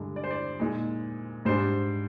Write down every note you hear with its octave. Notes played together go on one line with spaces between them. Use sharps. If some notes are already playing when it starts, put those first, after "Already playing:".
Already playing: G2 D3 G#3
D5
C5
D5
A#2 G#3 D#4
G#2 G3 D4 C5